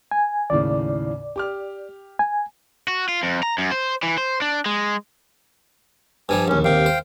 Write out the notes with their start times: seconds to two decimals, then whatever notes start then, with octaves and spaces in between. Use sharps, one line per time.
0.11 G#5
0.50 D#2 A2 C#3 D5
1.36 G4 D6 F6
2.19 G#5
2.88 F#4
3.08 F4
3.23 F2
3.43 A#5
3.58 F#2
3.71 C5
4.03 E3
4.18 C5
4.42 D4
4.66 G#3
6.29 G2 F3 G3 G#5
6.48 A#1 D#2 C#4
6.64 D#2 C3 F5 G5
6.86 C5